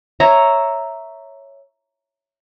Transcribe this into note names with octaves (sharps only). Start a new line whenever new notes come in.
C#5 E5 A#5